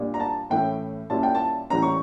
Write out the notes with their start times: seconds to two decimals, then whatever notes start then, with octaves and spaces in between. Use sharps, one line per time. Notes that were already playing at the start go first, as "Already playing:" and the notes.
Already playing: A#2 G3 D4
0.14 A#5
0.20 A5
0.50 A2 E3 A3 C#4 E4 G5
1.10 A#2 G3 C#4 E4 A5
1.23 G5
1.35 A5
1.70 A2 E3 G3 C#4 A#5
1.82 C#6